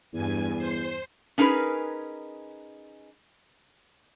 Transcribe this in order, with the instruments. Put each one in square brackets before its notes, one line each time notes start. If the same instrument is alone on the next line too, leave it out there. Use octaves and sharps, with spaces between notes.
[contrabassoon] E2 [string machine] G2 G#5
[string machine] C5 C7
[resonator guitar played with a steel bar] C#4 D#4 G#4 A#4 B4